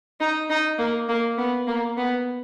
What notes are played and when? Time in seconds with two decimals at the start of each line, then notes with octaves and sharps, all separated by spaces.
0.20 D#4
0.50 D#4
0.79 A#3
1.09 A#3
1.37 B3
1.67 A#3
1.97 B3